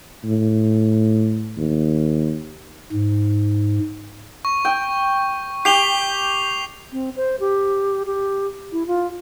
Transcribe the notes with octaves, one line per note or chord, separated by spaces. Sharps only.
A2
D#2
G#2
C#6
G5
G4 C7 F7 G7
C4
C5
G4
G4
E4
F4